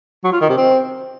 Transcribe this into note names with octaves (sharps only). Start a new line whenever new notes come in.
F#3
F4
D#3
C3
C4